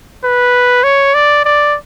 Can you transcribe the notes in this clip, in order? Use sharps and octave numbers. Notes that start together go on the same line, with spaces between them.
B4
C#5
D5
D5